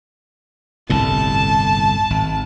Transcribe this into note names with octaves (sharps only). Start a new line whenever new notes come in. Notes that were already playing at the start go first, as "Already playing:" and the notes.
G1 C2 A2 A5
G#1